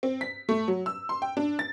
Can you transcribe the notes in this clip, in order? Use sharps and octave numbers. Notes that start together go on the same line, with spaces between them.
C4
B6
A3
F#3
E6
C6
G5
D4
A6